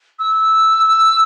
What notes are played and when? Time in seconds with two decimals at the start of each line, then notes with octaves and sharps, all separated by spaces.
0.19 E6